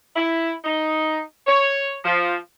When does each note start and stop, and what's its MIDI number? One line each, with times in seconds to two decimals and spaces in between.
0.16 0.52 64
0.64 1.20 63
1.47 1.96 73
2.04 2.35 53